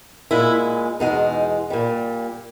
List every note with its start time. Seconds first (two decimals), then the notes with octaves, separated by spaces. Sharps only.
0.31 A#2 G#3 E4
1.00 E2 B2 G#3 D#4
1.70 A#2 G3